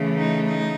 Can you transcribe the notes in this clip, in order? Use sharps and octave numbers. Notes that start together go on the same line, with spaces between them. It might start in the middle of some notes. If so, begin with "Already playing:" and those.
Already playing: C#3 E3 A3
D#4
D#4